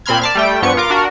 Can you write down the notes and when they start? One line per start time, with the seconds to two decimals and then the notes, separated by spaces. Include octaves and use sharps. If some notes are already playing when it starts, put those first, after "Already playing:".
0.06 A#2 C4 B5 C6 F6 G#6
0.22 D5 A5 F6
0.35 G3 A3 G5
0.62 G2 F3 B3 C#6 C#7
0.77 F4 A#4 D6
0.90 D4 F#4 A#4